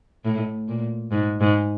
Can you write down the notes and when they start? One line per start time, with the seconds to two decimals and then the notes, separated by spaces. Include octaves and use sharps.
0.25 A2
0.68 A#2
1.12 G#2
1.41 G#2